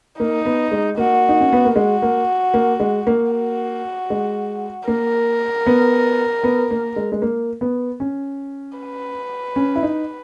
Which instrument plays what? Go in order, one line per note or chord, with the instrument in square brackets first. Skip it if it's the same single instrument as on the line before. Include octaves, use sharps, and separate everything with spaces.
[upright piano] A#3 [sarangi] D#4
[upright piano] B3
G#3
[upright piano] A#3 [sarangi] F#4
[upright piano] D#4
C#4
B3
A#3
[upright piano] G#3 [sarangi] F#4
[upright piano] A#3
A#3
G#3
A#3
[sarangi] F#4
[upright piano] G#3
[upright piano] A#3 [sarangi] A#4
[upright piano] B3
B3
A#3
G#3
G#3
A#3
B3
C#4
[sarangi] B4
[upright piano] C#4
E4
D#4